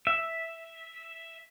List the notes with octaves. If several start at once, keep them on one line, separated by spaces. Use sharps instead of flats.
E5